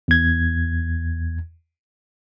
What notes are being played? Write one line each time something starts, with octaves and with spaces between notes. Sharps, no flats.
E2 G#6